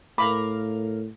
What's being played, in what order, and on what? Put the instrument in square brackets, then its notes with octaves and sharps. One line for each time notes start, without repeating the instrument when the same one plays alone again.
[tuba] A2 [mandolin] A#4 F5 D6 [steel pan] B5